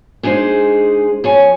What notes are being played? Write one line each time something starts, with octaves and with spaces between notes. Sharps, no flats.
G#3 D4 D#4 G#4 C5
F3 C#5 G#5